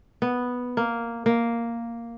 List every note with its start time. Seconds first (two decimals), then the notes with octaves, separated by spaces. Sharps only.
0.22 B3
0.77 A#3
1.26 A#3